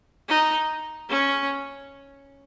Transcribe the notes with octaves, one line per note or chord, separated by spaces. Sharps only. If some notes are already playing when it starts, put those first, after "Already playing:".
D#4
C#4